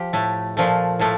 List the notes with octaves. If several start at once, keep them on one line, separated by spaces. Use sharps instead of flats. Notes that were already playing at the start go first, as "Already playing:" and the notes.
Already playing: F3 G4
A2 A3
A#2 F3 A3
A2 F3 A3